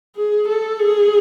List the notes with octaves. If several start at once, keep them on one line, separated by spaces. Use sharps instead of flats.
G#4
A4
G#4